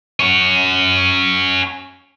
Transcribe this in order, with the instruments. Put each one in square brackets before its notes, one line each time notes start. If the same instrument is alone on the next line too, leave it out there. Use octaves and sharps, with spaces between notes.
[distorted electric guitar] C#4 F#4